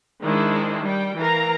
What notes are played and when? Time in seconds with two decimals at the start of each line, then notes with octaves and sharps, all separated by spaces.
0.22 D#3 G#3 D4 E4 C5
0.83 G3 G5
1.18 E3 A#4 F5 A#5